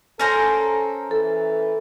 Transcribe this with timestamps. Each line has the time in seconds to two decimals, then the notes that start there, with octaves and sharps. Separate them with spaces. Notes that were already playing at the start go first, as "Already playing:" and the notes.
0.20 C#4 A4 A#4 C5
1.11 E3 A4